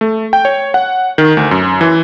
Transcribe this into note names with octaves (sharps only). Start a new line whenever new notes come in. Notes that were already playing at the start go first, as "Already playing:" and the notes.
A3
G5
C#5
F#5
D#3
D2
F#2
E3